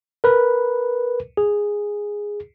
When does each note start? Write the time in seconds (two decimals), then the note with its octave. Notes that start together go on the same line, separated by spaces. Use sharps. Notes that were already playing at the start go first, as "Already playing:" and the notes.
0.24 A#4 B4
1.37 G#4